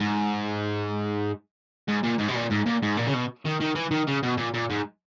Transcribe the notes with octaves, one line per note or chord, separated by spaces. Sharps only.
G#2
G#2
A#2
G#2
B2
A#2
G#2
A#2
G#2
A#2
C#3
B2
D#3
D#3
E3
D#3
C#3
B2
A#2
A#2
G#2